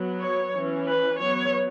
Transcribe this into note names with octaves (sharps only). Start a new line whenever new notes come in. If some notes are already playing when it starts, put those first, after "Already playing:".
Already playing: F#3 B3
C#5
E3 C#4
B4
F#3 B3 C#5